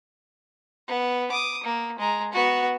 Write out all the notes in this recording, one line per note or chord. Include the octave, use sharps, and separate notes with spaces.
B3
D6 D#6
A#3
G#3 A#5
B3 F#4